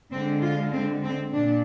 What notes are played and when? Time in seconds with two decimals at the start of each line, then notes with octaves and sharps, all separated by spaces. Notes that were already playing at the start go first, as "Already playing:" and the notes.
0.12 D3 G#3 C4
0.42 F4
0.72 C4
1.03 C4
1.32 A#2 D4